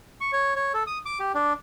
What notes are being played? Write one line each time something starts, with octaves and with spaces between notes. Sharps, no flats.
C#6
C#5
C#5
A4
D#6
D6
G4
D4